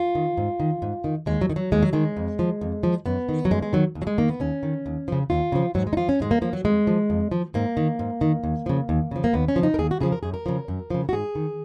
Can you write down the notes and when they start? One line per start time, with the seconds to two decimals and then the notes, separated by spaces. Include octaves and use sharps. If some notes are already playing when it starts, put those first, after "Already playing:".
Already playing: F4
0.15 D#3
0.37 G#2
0.60 D#3
0.82 G#2
1.04 D#3
1.26 D#2 G#3
1.41 F#3
1.50 D#3
1.56 F#3
1.72 D#2 G#3
1.82 F#3
1.93 D#3 G#3
2.17 F2
2.39 F3
2.61 F2
2.83 F3
3.06 F#2 B3
3.29 D#3
3.45 F#3
3.51 F#2 G#3
3.63 G#3
3.73 D#3 F#3
3.95 D#2
4.02 F#3
4.07 G#3
4.18 D#3 A#3
4.29 B3
4.40 D#2 C#4
4.63 D#3
4.86 D#2
5.08 C#3 F3
5.30 D#2 F4
5.52 C#3 F3
5.75 G#2 F#3
5.87 G#3
5.93 D#4
5.97 F3 F4
6.09 C#4
6.20 G#2 G#3
6.31 A#3
6.42 F3 A#3
6.53 F#3
6.65 F2 G#3
6.87 F3
7.10 F2
7.31 F3
7.54 G#2 A#3
7.77 D#3
7.99 G#2
8.21 D#3
8.44 D#2
8.66 C#3 F3
8.89 D#2
9.11 C#3 F3
9.24 A#3
9.34 D#2 B3
9.48 C#4
9.56 C#3 F3
9.63 D#4
9.74 A#4
9.79 D#2 G#4
9.91 F#4
10.01 C#3 F3 G#4
10.12 A#4
10.23 F#2 G#4
10.34 A#4
10.46 C#3 F3
10.68 F#2
10.90 C#3 F3
11.09 F#4
11.12 G#2 G#4
11.35 D#3